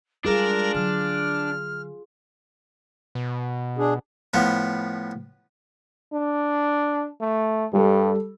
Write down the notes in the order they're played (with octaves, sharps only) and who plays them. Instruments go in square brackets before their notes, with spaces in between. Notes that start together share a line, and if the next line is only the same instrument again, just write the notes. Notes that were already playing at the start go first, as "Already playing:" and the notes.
[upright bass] G3 G#3 [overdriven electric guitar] D4 [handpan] F4 G#4 [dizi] A#4
[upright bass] D3 F#3 [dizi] F6
[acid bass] B2
[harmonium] D4 G#4
[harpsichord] A2 F3 B3
[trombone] D4
A3
[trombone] G2 [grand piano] G3 A4